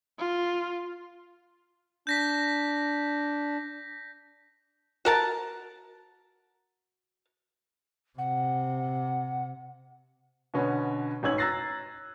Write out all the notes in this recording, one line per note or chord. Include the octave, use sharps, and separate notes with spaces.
F4
D4 G6 A#6 B6
F#4 A#4 A5
C3 F#5
B2 D3 B3 C#4
A1 G#2 C#4 E6 G#6 F#7
A#5 E6 F#6 A6 A#6 C7